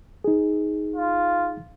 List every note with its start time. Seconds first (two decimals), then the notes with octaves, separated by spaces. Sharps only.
0.24 D#4 G#4
0.96 F4